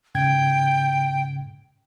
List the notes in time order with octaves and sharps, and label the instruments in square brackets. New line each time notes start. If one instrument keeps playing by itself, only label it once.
[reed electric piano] G#2 C#3 G#6 [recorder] G5